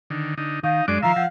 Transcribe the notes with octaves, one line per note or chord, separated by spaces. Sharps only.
D3 D#3
D3 D#4
D#3 D#4 F5
F#2 G#3 D4 D5 D6
D#3 F3 E5 F5 A#5
F3 F#5